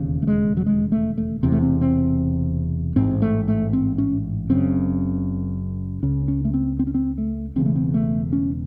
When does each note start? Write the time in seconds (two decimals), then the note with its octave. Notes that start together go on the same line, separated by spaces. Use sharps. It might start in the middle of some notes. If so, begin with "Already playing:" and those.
Already playing: E1 D#2 C#3
0.22 A3
0.27 G#3
0.57 F#3
0.66 G#3
0.92 A3
1.18 A3
1.43 E1 E2 C3 C4
1.52 A3
1.62 C4
1.81 C4
2.96 A1 G#2 C4
3.22 A3
3.48 A3
3.73 C4
3.98 C#4
4.49 F#1 F#2 C#3 C4
6.03 C#2 C#3 C#4
6.28 C#4
6.45 A3
6.54 C4
6.79 C4
6.87 C#4
6.94 C4
7.18 A3
7.56 E1 E2 C#3 C4
7.66 A3
7.76 C4
7.94 A3
8.33 C#4